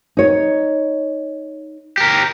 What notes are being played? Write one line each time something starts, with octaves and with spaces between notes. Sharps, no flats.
D#4 C#5
G4 A#4